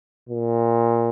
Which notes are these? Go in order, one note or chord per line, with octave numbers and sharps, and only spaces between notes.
A#2